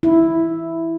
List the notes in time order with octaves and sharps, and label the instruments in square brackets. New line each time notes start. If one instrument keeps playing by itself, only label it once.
[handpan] E4